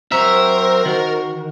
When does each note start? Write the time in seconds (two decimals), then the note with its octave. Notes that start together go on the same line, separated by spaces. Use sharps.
0.12 F#3 C4 A#4 C5 E5
0.85 D#3 F#4